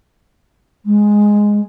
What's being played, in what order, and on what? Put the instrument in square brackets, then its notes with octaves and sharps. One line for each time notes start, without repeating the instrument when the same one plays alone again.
[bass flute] G#3